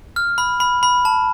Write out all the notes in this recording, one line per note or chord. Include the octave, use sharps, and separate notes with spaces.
F6
B5
B5
B5
A5